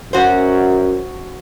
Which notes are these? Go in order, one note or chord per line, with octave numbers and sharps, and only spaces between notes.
F#2 C#4 F#4 C5